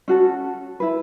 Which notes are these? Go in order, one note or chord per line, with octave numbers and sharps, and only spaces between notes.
C#4 F#4 A4
E4 B4